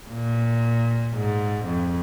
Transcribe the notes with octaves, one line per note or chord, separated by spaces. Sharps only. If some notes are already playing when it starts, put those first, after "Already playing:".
A#2
G#2
F2